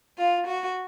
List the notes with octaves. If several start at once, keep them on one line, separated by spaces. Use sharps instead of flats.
F4
F#4